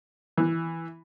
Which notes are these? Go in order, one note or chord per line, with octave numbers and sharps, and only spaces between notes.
E3